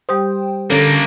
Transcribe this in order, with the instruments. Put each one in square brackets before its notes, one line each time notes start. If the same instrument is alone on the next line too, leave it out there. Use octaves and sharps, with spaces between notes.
[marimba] G3 G4 D#6 [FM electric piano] C5 G5
[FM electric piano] D3 C#4 A4 [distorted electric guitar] A#3 D4